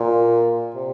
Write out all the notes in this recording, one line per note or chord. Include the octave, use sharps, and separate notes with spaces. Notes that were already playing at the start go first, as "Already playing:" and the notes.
Already playing: A#2
C3